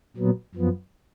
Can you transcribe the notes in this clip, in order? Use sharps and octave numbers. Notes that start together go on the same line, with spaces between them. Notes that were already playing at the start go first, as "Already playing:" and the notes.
A#2 F#3 B3
F#2 F3 B3